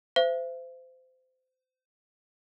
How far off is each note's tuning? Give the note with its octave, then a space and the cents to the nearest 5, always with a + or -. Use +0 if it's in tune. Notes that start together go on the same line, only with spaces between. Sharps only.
C5 -25 E5 +35